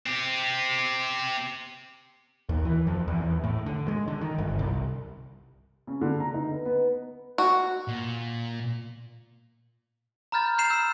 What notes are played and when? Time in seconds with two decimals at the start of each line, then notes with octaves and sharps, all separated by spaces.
0.06 C4 G4
2.49 D#2
2.65 E3
2.87 F2
3.08 E2
3.21 E2
3.44 A2
3.66 D3
3.88 G#3
4.08 D3
4.21 D#3
4.38 G1
4.59 C2
5.87 C#3
6.01 D3
6.20 A#5
6.34 D#4
6.53 B3
6.65 B3
7.38 F#4
7.88 A#2
10.32 A#5 B5 F6 G6 A6
10.57 C6 F6 G6 C7 E7 F7
10.70 E6